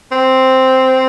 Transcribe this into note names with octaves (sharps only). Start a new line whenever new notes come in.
C4